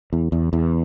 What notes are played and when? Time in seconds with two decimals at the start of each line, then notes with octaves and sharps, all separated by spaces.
0.13 E2
0.32 E2
0.53 E2